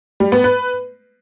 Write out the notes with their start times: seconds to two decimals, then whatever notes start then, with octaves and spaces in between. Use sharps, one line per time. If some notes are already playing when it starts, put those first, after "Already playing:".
0.20 G3
0.32 B3
0.44 B4